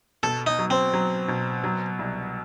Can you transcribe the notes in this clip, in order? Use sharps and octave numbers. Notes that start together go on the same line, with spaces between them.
B2 A4
D#4
F#3
C4
F#3
B2
F#3
C2